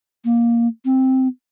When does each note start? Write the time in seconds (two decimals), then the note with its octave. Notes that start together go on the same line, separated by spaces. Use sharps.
0.25 A#3
0.85 C4